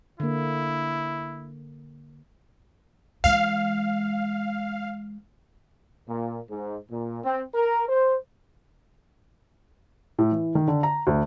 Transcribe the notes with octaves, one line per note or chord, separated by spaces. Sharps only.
D3 A#3 E4
E3 G#3 F5
A#2
G#2
A#2
C4
A#4
C5
A2
E3
D#3
D3
A#5
D2